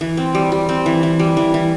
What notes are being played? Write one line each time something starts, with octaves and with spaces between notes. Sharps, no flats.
E3
C4
G3
G3
C4
E3
E3
G3
E3
E3